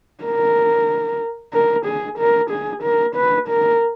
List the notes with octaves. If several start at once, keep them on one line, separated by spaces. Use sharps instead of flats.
A#4
A#4
G#4
A#4
G#4
A#4
B4
A#4